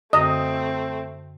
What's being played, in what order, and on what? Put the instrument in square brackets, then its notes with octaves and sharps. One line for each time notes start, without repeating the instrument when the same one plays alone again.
[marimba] F#2 D3 D#6 [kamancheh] A3 C4 [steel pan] D#5